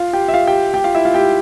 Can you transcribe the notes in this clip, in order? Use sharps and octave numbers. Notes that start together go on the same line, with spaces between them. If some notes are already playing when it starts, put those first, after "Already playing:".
Already playing: F4 F5
G4 G5
E5
F4 F5
G4 G5
G4 G5
F4 F5
E4 E5
F4 F5
G4 G5